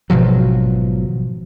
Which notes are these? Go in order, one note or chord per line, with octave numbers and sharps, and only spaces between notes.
G#1 B2 F3 F#3